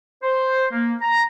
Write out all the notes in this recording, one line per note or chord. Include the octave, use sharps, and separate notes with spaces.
C5
A#3
A#5